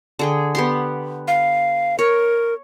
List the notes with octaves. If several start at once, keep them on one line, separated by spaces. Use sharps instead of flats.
D3 G#4 G5
B3 G4 C6
F5
A#4 C#5